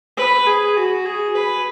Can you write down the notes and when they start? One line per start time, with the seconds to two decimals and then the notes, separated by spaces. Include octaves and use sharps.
0.17 B4
0.47 G#4
0.77 F#4
1.06 G#4
1.36 B4